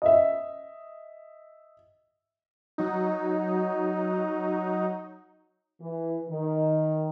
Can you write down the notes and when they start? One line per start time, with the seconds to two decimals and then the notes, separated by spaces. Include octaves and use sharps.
0.02 D#5 E5
2.78 F#3 D#4
5.81 E3
6.30 D#3